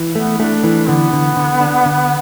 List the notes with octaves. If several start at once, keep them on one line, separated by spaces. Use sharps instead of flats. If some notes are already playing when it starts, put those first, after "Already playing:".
Already playing: E3
A3 B3
A3 D4
E3
D3 B3
D3
D3
D4
D3